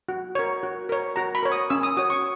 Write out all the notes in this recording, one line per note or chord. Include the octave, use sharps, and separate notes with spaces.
F#4
A#4 C#5
F#4
A#4 C#5
F#4 A#5
B5
A#4 C#5
D#6
C#4 E6
D#6
F#4 C#5 D#6
C#6